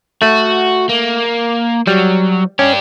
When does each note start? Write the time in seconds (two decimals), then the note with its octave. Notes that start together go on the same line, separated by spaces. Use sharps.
0.22 A3 F#4
0.89 A#3
1.87 F#3 G3
2.59 C#4 D4 G4